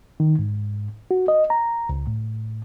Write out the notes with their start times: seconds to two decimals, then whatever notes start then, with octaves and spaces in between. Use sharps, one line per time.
0.20 D#3
0.39 G#2
1.11 F#4
1.28 D#5
1.50 A#5
1.89 C#2
2.07 A2